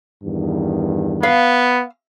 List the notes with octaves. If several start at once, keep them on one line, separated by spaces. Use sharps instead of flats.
E2 G2 D#3
B3 F5